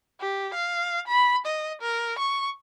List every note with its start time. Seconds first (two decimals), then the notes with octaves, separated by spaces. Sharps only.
0.21 G4
0.54 F5
1.08 B5
1.46 D#5
1.82 A#4
2.19 C#6